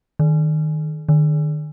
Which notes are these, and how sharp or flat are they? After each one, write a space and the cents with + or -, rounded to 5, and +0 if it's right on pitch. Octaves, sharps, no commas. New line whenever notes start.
D#3 -10
D#3 -40